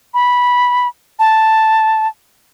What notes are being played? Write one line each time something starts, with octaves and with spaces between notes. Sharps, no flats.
B5
A5